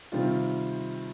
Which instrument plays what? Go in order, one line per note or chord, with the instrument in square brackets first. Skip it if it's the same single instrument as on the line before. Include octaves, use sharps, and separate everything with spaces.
[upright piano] C3 D#3 G3 F4